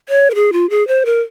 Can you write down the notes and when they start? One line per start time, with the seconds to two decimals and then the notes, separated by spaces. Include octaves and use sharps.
0.09 C#5
0.30 A#4
0.35 G#4
0.53 F4
0.70 G#4
0.88 C5
1.06 A#4